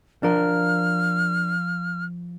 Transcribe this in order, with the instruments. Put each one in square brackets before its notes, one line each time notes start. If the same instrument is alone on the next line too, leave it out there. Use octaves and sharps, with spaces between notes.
[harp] F3 [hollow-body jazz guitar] D4 A#4 [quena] F6